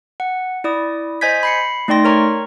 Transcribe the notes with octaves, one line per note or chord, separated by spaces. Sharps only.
F#5
E4 D5 D#6
C5 D#5 G#5 G6 G#6 B6
B5 C7 C#7
A3 D#4 D5 G5 C6 A#6
A#4 C#5 A#5 C#6